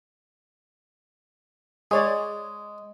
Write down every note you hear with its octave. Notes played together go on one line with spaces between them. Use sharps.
G#3 G#4 C#5 D5